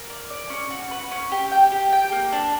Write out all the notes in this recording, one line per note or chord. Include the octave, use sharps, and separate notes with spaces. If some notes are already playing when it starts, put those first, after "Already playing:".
Already playing: A#4
D5
D5
C#4
F#4
B4
C#4
G4
G5
G4
G5
A#3
D4